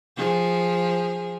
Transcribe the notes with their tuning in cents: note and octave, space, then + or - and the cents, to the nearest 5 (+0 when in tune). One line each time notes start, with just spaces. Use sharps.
F3 +5 G#4 -15